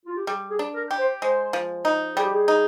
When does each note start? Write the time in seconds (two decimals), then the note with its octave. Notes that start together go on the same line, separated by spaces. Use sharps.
0.06 F4
0.17 G4
0.27 G3 G#4
0.50 G#4
0.59 D4
0.75 A#4
0.91 G4
0.98 C5
1.22 G#3 C5
1.53 F3
1.85 D#4
2.16 G3 G#4
2.24 G4
2.33 G#4
2.48 D#4